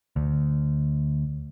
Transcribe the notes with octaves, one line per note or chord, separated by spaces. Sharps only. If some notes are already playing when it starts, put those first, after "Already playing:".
D2